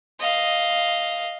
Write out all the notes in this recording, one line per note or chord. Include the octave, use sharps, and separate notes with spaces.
D#5 F5